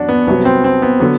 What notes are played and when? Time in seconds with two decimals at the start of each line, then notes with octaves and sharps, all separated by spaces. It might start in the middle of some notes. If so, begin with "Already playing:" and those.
Already playing: E2 B2 F#3 D4 F#4
0.09 B3
0.27 C2 C3 F#3 B3
0.45 C4
0.64 C4
0.82 B3
1.00 D3 F#3 B3